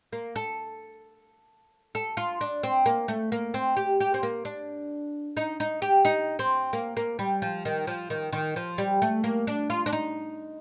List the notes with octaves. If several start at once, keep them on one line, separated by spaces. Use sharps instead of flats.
A#3
A4
A4
F4
D4
C4
A#3
A3
A#3
C4
G4
G4
C4
A#3
D4
D#4
D#4
G4
D#4
C4
A#3
A#3
G3
F3
D#3
F3
D#3
D#3
F3
G3
A3
A#3
D4
F4
D4
D#4